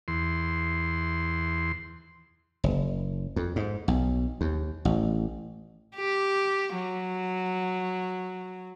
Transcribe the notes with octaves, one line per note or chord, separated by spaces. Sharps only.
E2 C6
F#1
F2
G#2
B1
D#2
A1
G4
F#3